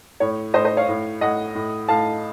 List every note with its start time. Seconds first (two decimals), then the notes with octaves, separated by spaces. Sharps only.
0.20 A2 C#5
0.54 A2 C5 D#5
0.65 C5 D#5
0.77 C#5 F5
0.88 A2
1.21 A2 D#5 F#5
1.55 A2
1.88 A2 F5 A5